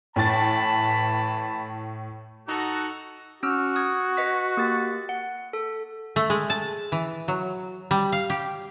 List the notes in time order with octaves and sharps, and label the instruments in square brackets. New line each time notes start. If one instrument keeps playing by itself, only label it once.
[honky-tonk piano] A2 G5 A6 [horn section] E3 A5 B5
[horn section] D#4 F#4 A4
[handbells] C#4 E6 F6 [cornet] F#4
[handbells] D#6 G#6
B4 D#5 B6
A#3 G4 A6
F#5
A4
[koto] A3
G#3
A5
E3
F#3
G3
F5
G4